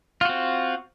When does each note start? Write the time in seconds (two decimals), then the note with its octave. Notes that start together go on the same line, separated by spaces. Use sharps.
0.21 F4
0.25 F#4
0.29 C4